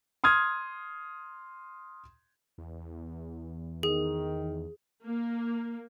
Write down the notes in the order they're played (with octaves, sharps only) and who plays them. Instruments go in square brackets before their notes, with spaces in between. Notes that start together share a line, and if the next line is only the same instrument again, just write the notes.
[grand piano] C6 D#6 F6 G#6
[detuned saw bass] E2
[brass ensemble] D#3 [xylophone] G#4
[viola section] A#3